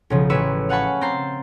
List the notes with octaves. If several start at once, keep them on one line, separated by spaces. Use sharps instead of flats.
B1 C#3 F3
A1 B4 C#5 E6 E7
F5 F#5 G#5 A5 B5 C#6
C4 A#5 G6 A6 C7